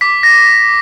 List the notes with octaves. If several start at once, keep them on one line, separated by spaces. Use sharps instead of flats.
D6 B6
A#6